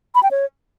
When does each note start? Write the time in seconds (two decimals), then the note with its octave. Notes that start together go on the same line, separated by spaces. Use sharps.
0.15 B5
0.23 G5
0.31 C#5